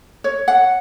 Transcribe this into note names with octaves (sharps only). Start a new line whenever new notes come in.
C#5
F#5